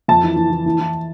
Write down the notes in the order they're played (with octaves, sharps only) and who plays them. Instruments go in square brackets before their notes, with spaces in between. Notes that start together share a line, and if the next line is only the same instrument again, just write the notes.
[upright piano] F2 A5
E3
E3
E3
E3
E3